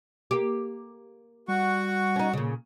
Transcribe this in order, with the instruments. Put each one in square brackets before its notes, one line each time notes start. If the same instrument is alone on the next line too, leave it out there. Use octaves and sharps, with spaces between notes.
[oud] A#3 G4
[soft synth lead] G3 [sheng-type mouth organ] F#4 F#5 C#6
[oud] C#4 D#4
A#2 C#3